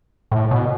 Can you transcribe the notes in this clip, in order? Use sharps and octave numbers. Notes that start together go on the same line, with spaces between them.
A2
B2